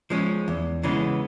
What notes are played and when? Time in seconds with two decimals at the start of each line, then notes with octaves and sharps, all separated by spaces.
0.10 F3 G#3 C#4
0.48 E2
0.83 C#3 E3 G#3 B3